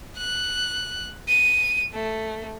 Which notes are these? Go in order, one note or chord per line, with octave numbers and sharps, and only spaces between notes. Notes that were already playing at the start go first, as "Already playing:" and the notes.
F#6
D#7
A3